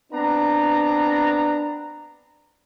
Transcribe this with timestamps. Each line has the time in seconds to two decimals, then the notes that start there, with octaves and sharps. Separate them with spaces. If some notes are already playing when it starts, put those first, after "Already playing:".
0.12 B3 C4 D4 A#5